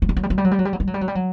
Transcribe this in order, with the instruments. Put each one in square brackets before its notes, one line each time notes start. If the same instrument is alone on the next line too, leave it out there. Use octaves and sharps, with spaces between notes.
[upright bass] F#3
G3
F#3
G3
F#3
G3
F#3
G3
F#3
G3
F#3
G3
F#3
G3
F#3
G3
F#3